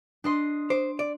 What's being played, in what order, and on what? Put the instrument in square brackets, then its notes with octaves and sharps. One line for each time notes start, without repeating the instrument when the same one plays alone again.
[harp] D4 D#5 C6
[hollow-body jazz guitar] C5 [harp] D6
[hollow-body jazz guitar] D5